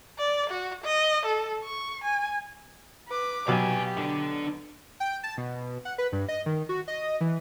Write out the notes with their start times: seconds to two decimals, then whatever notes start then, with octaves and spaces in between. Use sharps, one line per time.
0.18 D5
0.50 F#4
0.84 D#5
1.26 A4
1.64 C#6
2.04 G#5
3.08 B4 D6
3.48 B2 F#3 G4 F5 G#5
3.98 D4 A4
5.00 G5
5.23 A5
5.38 B2
5.85 F#5
5.98 B4
6.12 G2
6.29 D#5
6.46 D#3
6.69 F#4
6.88 D#5
7.21 E3